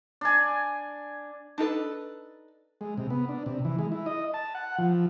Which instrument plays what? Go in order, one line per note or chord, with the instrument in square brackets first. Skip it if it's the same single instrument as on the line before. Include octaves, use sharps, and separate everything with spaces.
[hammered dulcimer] D4 G#5
[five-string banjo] D4 D#4 A4 B4
[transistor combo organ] G#3
C3
B3
D4
C3
E3
G#3
E4
D#5
A5
F#5
F3